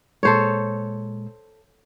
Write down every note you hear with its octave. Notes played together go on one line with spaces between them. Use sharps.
A#2 G#3 A4 C5 C#5